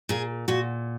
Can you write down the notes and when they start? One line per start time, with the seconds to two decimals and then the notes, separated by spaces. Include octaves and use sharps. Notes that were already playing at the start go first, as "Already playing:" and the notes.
0.09 A#2 G#4
0.48 A#2 F#4